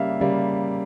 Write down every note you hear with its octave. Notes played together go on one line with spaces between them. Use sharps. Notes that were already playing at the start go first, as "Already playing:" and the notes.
Already playing: C#3 G3 A#3 E5 F5
C#3 G3 A#3